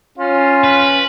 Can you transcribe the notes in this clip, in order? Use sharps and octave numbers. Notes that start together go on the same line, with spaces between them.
C#4 F4
B4